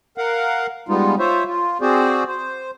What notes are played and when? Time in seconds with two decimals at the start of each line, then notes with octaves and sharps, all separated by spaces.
0.18 A#4 F5 F#5
0.89 G3 G#3 B3 D#4 F4
1.19 F4 C5 C#5 E5
1.47 F4
1.81 C4 F#4 G#4 C5 D5
2.27 C5